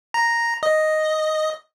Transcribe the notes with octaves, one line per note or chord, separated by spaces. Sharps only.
A#5
D#5